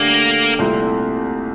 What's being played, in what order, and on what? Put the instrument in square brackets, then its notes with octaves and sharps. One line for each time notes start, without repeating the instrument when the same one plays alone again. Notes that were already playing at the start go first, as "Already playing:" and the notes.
Already playing: [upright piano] D3 A3 D4 G4 [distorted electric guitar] A#3
[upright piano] C2 A#2 A3 C4 E4